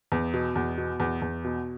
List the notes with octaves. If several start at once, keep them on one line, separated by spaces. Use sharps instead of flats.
E2
B2
E2
B2
E2
E2
B2